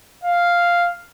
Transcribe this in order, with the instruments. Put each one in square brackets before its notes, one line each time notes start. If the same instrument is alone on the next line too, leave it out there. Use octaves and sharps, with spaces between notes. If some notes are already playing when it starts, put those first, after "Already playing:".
[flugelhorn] F5